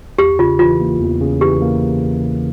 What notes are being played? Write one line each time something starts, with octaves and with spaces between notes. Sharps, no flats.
E2 G4
C#3 F4
E3 F4
A#3
E2
C#3
E3 G4
A#3